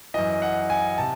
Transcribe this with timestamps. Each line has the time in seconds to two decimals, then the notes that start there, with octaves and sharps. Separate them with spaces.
0.14 F#2 E3 D#5
0.42 F#5
0.70 G#5
0.98 C3 A5